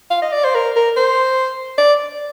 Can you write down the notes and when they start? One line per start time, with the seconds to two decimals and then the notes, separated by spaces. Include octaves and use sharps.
0.10 F5
0.22 D#5
0.32 D5
0.44 C5
0.55 A#4
0.76 A#4
0.97 C5
1.78 D5